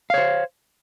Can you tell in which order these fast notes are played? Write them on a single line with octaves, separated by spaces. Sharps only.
F5 C#5 C5